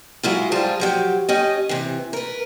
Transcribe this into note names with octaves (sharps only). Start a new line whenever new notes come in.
F#3 G#3 E4 F4
G#2 G3 G#3 F4 C5 A5
F3 F#3 G4
C#4 G4 D#5
C3 E3
A#4 B4